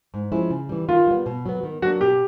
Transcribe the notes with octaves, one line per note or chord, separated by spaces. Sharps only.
G#2
F3 G#3 C#4 E4
C#3
E3 G3
D#3 F4
G3 B3
B2
F#3 B3
D#3
F#3 A#3 D4 F#4
B2 G4